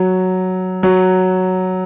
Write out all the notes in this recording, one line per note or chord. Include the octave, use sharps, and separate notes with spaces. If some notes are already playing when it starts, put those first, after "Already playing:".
Already playing: F#3
F#3